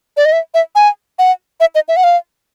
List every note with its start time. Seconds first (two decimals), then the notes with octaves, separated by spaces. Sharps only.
0.17 D5
0.25 D#5
0.33 E5
0.54 E5
0.75 G#5
1.19 F#5
1.60 E5
1.75 D#5
1.88 E5
1.97 F#5
2.04 F5